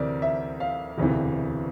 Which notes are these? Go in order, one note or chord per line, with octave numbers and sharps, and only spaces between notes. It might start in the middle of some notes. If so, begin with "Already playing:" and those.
Already playing: D2 C3 E3 A#4 D5
E5
F5
E1 D2 C3 E3